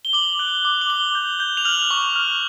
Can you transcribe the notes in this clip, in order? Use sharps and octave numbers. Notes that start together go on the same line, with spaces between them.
G7
D6 F#7
F#6
D6
F#7
D6 G7
G6
G6
F7
F6 F#7
C#6
F6